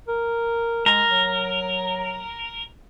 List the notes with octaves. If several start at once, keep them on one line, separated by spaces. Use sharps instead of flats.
A#4
G#3 A#4
F#3